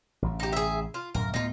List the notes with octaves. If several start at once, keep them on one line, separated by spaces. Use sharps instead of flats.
A1 C#3
D#4 G4
G#4 E5
F4
D1 F#2 A2 A#4
D2 A2 B3 D#4 F4